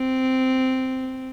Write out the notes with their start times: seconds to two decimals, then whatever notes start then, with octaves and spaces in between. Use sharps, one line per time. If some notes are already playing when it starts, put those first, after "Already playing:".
Already playing: C4